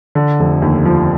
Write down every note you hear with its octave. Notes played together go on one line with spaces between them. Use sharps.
D3
F1
D#2
F3